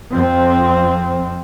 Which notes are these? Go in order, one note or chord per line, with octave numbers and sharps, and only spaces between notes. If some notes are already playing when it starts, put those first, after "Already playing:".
F2 F3 C4